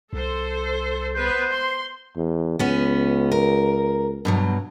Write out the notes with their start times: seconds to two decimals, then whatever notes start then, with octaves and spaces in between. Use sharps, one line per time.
0.13 C2 A4 C5
1.15 B3 B4 C5
1.54 C6
2.16 E2
2.59 C#2 B3 C#4
3.32 A#4
4.25 G2 B2 F#3